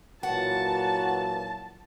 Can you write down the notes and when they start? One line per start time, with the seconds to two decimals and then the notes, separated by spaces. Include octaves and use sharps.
0.23 A#2 E3 F#3 F#4 F#5 A5